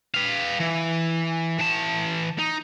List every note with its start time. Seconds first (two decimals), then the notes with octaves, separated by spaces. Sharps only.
0.14 B4 F5
0.60 E3
1.59 E3 A5
2.39 D#4